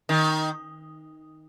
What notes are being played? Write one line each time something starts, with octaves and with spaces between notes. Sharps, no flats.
D#3